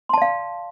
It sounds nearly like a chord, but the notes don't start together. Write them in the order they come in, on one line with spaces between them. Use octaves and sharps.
C6 A5 D5 F5